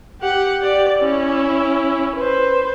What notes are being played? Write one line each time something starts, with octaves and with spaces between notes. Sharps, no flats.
G4 F#5
G4 D5
C#4 E4
B4 C5